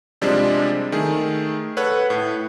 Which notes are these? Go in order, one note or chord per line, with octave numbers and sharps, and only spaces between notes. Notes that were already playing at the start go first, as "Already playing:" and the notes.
C3 F3 G3 G#3 C4 D4
D#3 A3 G#4
A4 B4 C#5 F#5 F#6
A2